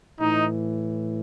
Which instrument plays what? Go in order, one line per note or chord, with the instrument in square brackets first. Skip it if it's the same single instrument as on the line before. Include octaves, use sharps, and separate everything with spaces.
[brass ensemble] A2 E3 D#4